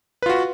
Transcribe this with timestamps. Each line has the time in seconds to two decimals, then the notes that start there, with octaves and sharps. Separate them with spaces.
0.22 B4
0.26 F4
0.29 F#4